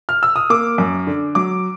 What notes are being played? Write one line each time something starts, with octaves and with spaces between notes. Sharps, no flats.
F6
E6
D#6
A#3 D6
F#2
D3
F#3 D6